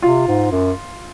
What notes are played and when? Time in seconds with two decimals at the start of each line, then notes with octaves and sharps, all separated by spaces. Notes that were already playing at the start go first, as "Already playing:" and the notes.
0.02 C3 F4
0.27 G#2
0.51 F#2